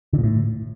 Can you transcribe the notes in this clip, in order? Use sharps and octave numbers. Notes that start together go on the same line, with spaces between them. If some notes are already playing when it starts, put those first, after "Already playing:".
D3
A#2
A2